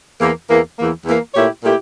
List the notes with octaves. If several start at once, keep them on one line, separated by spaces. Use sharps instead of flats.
E2 E3 A#3
E2 E3 A#3
E2 E3 A#3
E2 E3 A#3
A#2 A3 E4 G4 C#5
A#2 A3 E4 G4